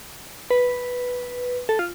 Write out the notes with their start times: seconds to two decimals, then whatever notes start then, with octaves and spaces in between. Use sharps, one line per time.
0.51 B4
1.69 A4
1.79 F4